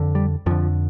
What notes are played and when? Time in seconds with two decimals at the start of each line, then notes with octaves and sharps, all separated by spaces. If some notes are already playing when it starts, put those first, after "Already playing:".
Already playing: F2 D3
0.15 G3
0.46 F2 D3 F3